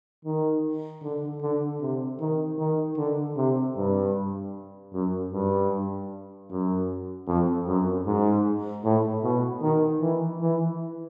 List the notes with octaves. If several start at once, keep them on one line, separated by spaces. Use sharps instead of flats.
D#3
D3
D3
C3
D#3
D#3
D3
C3
G2
F#2
G2
F#2
F2
F#2
G#2
A2
B2
D#3
E3
E3